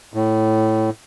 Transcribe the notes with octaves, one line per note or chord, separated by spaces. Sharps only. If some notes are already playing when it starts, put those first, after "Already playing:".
A2